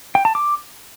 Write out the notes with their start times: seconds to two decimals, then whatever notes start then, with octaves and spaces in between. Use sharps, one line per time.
0.15 G5
0.25 A5
0.35 D6